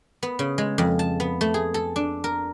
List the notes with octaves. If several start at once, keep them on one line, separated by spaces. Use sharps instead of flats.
B3
C#3
G#3
F2
A5
B3
A3
G#4
A4
D4
A#4